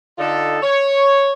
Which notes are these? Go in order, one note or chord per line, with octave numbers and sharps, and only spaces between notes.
D3 D#4 F4 A4
C#5